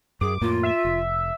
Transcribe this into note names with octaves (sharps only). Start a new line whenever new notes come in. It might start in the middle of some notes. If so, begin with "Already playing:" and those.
F#2 G#4 D6
F2 A2 A#3 F4
E5
F1